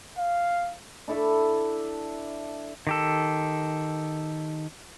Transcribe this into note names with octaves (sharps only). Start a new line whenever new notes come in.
F5
D4 E4 A4 E5
D#3 G4 A4